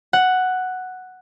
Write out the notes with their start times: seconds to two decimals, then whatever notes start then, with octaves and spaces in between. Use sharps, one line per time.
0.13 F#5